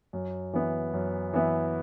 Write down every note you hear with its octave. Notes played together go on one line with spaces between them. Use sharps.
F#2
E3 B3 E4
F#2
E3 B3 E4